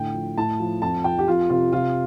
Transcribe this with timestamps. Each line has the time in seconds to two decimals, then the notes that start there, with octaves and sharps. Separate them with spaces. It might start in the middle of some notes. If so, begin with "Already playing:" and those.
Already playing: A2 D3 G5
0.14 F3
0.38 A2 A5
0.60 F3
0.82 F2 A5
1.04 F3 G5
1.19 G4
1.27 F2 F4
1.50 C3 F4
1.72 C3 F4